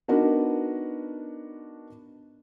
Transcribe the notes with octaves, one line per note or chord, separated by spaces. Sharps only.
B3 D4 D#4 F#4 A#4 B4